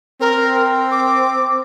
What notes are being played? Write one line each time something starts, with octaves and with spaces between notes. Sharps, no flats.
C4 A#4
D6